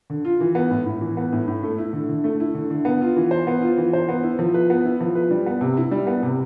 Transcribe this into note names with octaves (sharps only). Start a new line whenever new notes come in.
D3
F4
E3
B3
A2
A2
E3
B3
A2
A2
A3
E4
D3
D3
A3
E4
D3
D3
B3
F4
E3
C5
B3
F4
E3
C5
B3
E4
F3
B4
B3
E4
F3
B4
G3
B3
C3
E4
G3
B3
C3